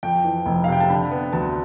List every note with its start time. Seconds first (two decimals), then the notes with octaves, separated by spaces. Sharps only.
0.03 F2 G5
0.24 E3
0.46 F1
0.64 F5
0.68 C3 G5
0.80 A5
0.90 D3 B5
1.11 B3
1.32 D2 A5